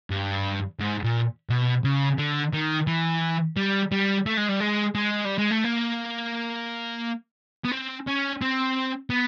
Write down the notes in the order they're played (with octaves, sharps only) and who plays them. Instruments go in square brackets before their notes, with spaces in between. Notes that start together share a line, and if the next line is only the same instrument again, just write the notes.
[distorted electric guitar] G2
G#2
A#2
B2
C#3
D3
D#3
E3
G3
G3
A3
G#3
G3
G#3
G#3
G3
G#3
A3
A#3
B3
C4
C#4
C4
B3